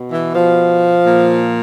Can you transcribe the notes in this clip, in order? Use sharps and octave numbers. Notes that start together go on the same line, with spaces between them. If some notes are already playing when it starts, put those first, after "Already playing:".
Already playing: B2
E3
F3
A#2